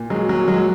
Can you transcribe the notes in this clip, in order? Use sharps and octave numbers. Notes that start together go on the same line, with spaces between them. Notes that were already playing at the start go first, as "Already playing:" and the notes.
Already playing: A#2
F#3 G#3
A#2 F#3
F#3 G#3